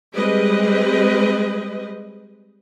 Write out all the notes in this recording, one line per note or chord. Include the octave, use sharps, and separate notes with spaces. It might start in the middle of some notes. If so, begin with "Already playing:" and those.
G3 G#3 C4 B4 D#5